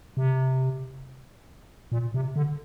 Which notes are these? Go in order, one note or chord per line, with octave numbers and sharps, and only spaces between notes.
C3
A#2
C3
D3